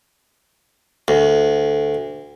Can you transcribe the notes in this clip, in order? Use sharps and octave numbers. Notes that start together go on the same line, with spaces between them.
D2